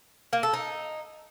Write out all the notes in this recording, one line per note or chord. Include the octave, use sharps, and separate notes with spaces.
A#3
A4
D#4